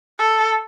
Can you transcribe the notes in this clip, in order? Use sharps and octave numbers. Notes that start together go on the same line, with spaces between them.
A4